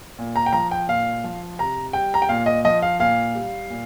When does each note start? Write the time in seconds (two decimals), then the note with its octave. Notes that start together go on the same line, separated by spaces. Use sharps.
0.19 A#2
0.36 A#5
0.46 G5
0.53 F3 A#5
0.71 G5
0.88 A#2 F5
1.24 F3
1.59 C3 A#5
1.93 G3 G5
2.14 A#5
2.22 G5
2.29 A#2 F5
2.46 D#5
2.65 F3 D#5
2.82 F5
3.00 A#2 F5
3.35 G3
3.70 A#2